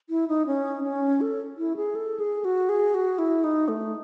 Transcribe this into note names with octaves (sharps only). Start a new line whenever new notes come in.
E4
D#4
C#4
C#4
A4
E4
G#4
A4
G#4
F#4
G#4
F#4
E4
D#4
A3